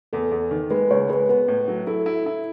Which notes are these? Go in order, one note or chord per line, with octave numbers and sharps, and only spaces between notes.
E2 A4
E2
D#3
G#3 B4
C#2 C#5
G#3 B4
B3 B4
A2
F#3
E4 A4
E4
E4